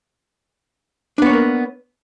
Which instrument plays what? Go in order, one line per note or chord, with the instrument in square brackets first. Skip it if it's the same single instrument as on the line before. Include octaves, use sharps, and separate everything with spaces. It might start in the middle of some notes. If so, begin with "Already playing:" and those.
[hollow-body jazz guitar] D4
B3
C#5
A#3
A#4